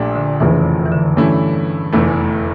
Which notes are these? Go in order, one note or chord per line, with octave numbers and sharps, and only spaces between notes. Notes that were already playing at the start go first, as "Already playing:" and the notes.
Already playing: A#1 A#2 A3 D4 G4
D3
F1 E2 C#3 E3 F3
E3
D3
G2 E3 A3 C#4 E4
F1 E2 E3 A3